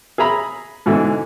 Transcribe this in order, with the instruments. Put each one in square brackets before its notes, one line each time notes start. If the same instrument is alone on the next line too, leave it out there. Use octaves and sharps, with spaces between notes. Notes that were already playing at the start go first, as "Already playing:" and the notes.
[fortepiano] G#4 E5 A#5 B5
G#2 B2 D3 E3